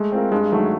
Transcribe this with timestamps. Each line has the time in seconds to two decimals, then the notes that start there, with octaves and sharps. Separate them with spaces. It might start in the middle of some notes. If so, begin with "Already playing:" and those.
Already playing: G#3 A3
0.12 C4 F4 A#4
0.32 G2 G#3
0.52 D#3 F#3 A3